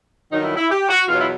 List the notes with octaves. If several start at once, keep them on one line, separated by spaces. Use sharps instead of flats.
G2 D#3 F#3 D#4
E4
E4
G4
F#4
E2 B2 F#3 F4
E4